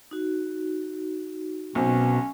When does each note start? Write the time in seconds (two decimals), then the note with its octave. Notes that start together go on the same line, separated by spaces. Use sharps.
0.11 D#4 F#4
1.75 B1 B2 C4 C#4